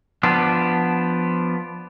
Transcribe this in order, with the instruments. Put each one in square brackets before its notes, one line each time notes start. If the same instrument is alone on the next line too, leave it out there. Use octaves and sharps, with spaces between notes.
[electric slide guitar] F3 B3 D4